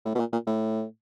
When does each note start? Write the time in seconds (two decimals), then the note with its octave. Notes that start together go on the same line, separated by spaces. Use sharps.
0.05 A2
0.15 B2
0.19 A#2
0.33 A#2
0.47 A2